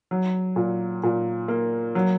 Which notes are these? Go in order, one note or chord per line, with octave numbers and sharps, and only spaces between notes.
F#3
A#2
A#2
A#3
F#3